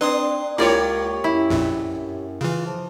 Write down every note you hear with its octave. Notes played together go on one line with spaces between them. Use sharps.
C4 D4 B4 C6 D#6
C#2 A#3 E4 F4 G4 C#5 D5
F#2 E4
A#1 F2 A#2
C#3 E3 F4
F3